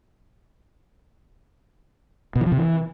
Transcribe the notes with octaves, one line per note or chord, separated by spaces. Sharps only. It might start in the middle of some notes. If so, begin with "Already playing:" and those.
B2
E3
F3
C3
E3